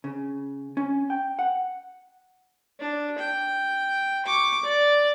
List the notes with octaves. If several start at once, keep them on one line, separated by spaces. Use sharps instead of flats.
C#3
C#4
G5
F#5
D4
G5
C#6 D6
D5